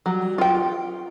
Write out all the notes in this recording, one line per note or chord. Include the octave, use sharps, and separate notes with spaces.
F#3 G3
F4 G5